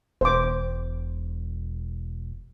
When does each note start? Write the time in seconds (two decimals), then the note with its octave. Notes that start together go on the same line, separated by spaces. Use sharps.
0.21 E1 C5 D6